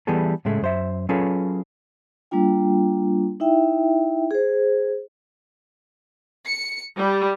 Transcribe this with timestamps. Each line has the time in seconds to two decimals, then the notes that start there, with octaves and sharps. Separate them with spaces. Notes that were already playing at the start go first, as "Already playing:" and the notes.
0.07 E3 G3 B3 G#4 A4
0.45 A2 C#3 G#3 A3
0.62 F#2 C5 E5
1.09 F#3 C#4 F4 G#4 A4 B4
2.31 G3 A#3 D4 F4 G5
3.40 D#4 E4 E5 G5
4.31 G#4 C5
6.47 C#7
6.96 G3